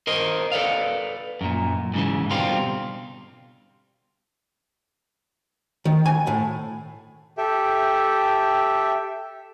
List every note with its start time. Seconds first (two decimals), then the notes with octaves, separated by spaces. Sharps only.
0.07 A#4 C5 D#5
0.52 A4 B4 D5 F5
1.41 F#2 A#2
1.94 G#2 C#3 E3
2.30 B2 D3 G3 C4 F4
5.85 D#3
6.06 G#5
6.27 A2
7.38 G4 A4 E5 G5